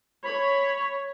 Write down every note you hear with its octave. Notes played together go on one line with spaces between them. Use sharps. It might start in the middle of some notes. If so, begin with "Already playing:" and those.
C#5 B5